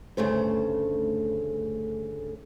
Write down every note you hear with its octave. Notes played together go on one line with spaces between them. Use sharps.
D2 G2 C#3 A3 C5